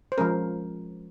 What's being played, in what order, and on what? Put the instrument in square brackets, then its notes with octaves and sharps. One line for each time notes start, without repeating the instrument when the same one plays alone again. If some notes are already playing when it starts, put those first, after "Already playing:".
[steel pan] C5
F3 G#3 C#4 A#4